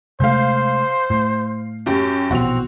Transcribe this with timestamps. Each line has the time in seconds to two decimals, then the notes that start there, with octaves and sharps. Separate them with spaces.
0.20 C3 G#3 A3 C5 F5 G6
1.10 A2
1.86 F#2 G4
2.31 A#1 B2 E3 C4 F#4 F7